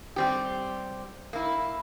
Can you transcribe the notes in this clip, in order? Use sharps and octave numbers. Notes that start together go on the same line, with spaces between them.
G3 C4 G4
A#3 E4